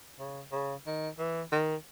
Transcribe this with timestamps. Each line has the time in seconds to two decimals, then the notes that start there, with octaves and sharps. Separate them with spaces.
0.19 C#3
0.52 C#3
0.86 D#3
1.19 E3
1.52 D#3